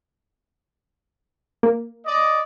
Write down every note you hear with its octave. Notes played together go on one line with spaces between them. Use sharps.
A#3
D5 D#5